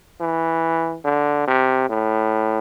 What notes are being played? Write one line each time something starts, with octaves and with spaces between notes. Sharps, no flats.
E3
D3
C3
A2